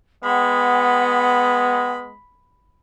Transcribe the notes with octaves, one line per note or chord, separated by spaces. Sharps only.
G#3 B3 F#5 G5 B5